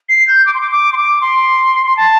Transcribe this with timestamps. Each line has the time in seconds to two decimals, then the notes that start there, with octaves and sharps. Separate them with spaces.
0.09 C7
0.28 G6
0.46 D6
0.54 C6
0.61 D6
0.71 D6
0.93 C6
0.97 D6
1.21 C6
1.87 C6
1.97 A5